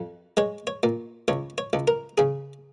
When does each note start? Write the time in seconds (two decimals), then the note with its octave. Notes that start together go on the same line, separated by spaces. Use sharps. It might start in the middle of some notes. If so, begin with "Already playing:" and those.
Already playing: F2
0.37 G#3 C#5
0.67 C#5
0.83 A#2
1.28 C#2 C#5
1.58 C#5
1.73 C#2
1.88 A#4
2.18 C#3 G#4